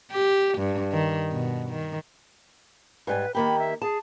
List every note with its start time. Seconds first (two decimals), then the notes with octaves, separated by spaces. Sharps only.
0.11 G4
0.59 G2
0.93 D#3
1.32 B2
1.70 D#3
3.07 G#2 G3 B4 G#5
3.34 D#3 A#3 G4 B5
3.59 E5
3.82 G#4 A5